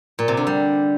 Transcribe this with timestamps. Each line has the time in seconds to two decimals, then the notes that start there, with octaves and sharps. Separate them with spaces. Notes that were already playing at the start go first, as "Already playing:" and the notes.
0.19 A#2
0.28 C3
0.37 D3
0.47 G3